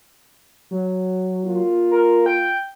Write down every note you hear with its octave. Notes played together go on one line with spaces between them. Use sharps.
F#3
A#3 F4
A#4
G5